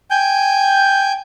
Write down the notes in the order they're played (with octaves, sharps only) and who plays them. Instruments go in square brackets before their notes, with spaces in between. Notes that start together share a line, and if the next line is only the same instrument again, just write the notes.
[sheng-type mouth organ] G5 G#5 G6